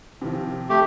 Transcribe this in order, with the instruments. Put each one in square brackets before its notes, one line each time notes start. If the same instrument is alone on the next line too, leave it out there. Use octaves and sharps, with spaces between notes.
[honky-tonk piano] C3 D#3 F3
[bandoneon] A3 G4